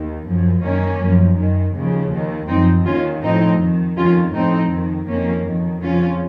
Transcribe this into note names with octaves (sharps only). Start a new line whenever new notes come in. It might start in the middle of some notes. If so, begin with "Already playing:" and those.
Already playing: D#2 D#3
F#2 F3
F#2 D#3 A#3 C#4
F#2 F3
F#2 D#3
D#2 C#3 F3
D#2 D#3
F#2 F3 C4 D#4
D#2 D#3 C#4 F4
A2 F3 C4 D#4
F2 D#3
F2 D#3 C#4 F4
A2 F3 C4 D#4
F2 D#3
F2 D#3 A#3 C#4
F2 D#3
F2 C#3 F3 C#4 F4